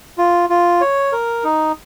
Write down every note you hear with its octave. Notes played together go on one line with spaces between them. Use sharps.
F4
F4
C#5
A#4
D#4